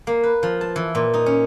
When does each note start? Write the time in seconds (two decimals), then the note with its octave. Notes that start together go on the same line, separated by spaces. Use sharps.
0.07 A#3
0.24 B4
0.43 F3
0.61 A5
0.76 E3
0.95 A#2
1.14 D#4
1.26 C#4